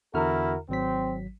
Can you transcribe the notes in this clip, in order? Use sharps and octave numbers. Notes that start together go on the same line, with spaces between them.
E2 D3 E4 F#4 A#4 F6
G#1 F#3 C4 B6